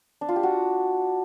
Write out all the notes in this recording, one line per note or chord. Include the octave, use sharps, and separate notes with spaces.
D4
F4
G4
F#4